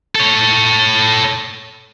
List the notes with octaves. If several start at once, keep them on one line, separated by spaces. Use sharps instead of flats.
A4 C#5